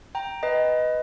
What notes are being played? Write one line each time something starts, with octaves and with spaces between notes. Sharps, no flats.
G5 A#5
B4 D#5